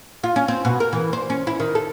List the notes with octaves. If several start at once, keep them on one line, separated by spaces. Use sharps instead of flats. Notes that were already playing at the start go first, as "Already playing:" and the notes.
F4
C#4
C4
B2
A#4
E3
C5
C#4
E4
D#3
A4